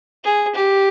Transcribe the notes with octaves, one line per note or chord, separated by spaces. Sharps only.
G#4
G4